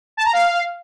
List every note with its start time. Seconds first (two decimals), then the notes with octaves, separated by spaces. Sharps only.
0.17 A5
0.25 A#5
0.33 F5